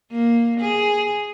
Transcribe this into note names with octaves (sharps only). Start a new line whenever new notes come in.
A#3
G#4